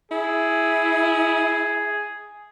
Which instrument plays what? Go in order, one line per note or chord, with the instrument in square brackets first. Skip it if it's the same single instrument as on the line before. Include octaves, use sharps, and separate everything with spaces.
[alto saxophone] E4 [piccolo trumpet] G#4